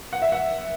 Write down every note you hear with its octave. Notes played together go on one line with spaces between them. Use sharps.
F#5
E5
F#5